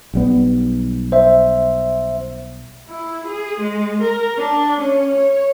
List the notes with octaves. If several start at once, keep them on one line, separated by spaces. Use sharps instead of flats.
B1 G3 B3
C5 E5
E4
G#4
G#3
A#4
D4
C#4
C#5